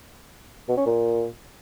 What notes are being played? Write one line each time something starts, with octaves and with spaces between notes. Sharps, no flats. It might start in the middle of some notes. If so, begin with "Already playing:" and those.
B2
C#4
A#2